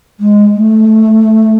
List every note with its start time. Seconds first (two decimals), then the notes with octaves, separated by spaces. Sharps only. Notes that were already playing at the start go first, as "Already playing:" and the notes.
0.20 G#3
0.55 A3